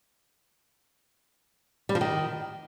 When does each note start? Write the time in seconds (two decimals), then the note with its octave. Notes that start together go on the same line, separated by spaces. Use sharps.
1.89 G3
1.95 F3
2.01 D#3